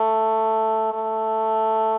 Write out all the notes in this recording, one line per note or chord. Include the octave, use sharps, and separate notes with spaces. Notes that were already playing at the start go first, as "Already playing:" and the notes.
Already playing: A3
A3